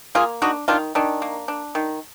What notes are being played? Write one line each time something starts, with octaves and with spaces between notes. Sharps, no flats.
A#3 F4 G#4
D4 D#4 F#4
D#3 D4 F4
D#3 D4
A#3
D4
D#3